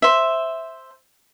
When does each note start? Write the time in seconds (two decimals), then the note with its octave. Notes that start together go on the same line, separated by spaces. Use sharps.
0.02 C5 E5